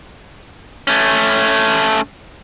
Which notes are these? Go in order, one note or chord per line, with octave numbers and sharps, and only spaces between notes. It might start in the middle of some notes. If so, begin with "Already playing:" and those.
A3 C#4